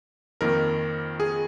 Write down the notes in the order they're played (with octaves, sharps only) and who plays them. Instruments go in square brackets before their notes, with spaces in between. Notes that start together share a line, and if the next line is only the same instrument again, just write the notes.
[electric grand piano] F2 D#3 A#3 A#4
G#4